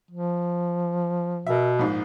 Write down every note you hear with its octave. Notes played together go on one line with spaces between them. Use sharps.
F3
B2 A#4 E5
A#1 G#2